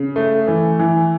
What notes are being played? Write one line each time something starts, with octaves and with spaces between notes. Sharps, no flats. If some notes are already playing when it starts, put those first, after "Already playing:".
Already playing: C#3
A3
E3
E3